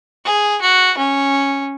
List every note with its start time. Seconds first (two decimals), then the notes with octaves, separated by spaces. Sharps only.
0.25 G#4
0.61 F#4
0.97 C#4